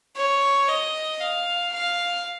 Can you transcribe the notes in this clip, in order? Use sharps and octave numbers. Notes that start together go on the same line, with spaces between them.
C#5
D#5
F5
F5